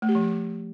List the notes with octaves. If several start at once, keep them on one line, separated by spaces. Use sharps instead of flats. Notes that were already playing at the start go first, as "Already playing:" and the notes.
A3
G4
F3